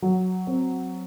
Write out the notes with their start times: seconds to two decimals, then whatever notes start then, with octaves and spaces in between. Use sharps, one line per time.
0.02 F#3
0.47 C4